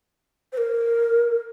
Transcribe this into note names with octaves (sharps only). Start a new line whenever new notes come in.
C5
A#4